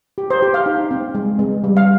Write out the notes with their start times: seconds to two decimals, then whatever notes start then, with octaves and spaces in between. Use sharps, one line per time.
0.18 G4
0.30 C5
0.42 G4
0.54 F5
0.66 D#4
0.91 C4
1.15 G#3
1.39 G#3
1.64 G3
1.77 F5